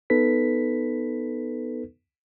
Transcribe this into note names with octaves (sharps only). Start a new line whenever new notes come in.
B3 D#4 A4 B4 B6